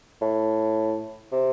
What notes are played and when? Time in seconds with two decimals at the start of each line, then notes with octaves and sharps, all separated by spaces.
0.22 A2
1.32 C3